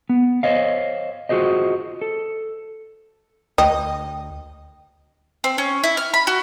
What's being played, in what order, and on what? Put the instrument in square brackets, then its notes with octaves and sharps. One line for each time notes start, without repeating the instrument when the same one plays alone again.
[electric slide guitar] B3
C5 C#5 D#5 F5
F4 F#4 G#4 C5 D#5
A4
[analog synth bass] D2 [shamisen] D#5 [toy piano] G5
[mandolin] C4
C#4
E4
F6
B5
F#4